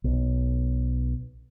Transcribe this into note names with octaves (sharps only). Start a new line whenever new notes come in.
B1